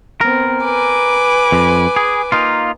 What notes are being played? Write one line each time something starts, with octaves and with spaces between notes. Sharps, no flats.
B3 C4 A#4
B4 G#5 D6
F2
G#4
A#3 D#4 F4